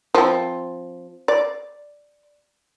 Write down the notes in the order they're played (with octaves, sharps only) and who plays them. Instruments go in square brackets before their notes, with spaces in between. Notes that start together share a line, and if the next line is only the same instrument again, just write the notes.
[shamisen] F3 C4
D5